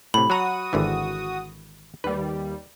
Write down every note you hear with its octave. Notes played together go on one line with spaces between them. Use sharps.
A2 C3 B5
F#3 F#4 A#5 D#6
G#1 D3 E3
D#2 G3 B4